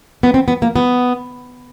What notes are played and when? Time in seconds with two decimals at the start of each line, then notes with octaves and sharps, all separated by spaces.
0.23 B3
0.34 C4
0.48 B3
0.62 A#3
0.76 B3